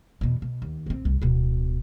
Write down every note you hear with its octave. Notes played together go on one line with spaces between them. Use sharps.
E2 B2
B2
D#2
A#1 C4
C2 C3
D1 B2